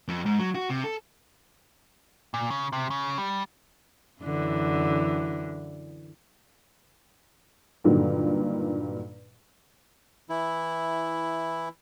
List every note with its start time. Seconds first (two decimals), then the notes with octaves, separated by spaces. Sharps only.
0.08 F2
0.26 G#2
0.39 F#3
0.55 F#4
0.69 C3
0.84 A4
2.34 A#2
2.50 C#3
2.73 C3
2.90 C#3
3.18 G3
4.22 F#2 D3 E3
7.84 G2 A#2 D3 D#3 F#3
10.29 E3 E4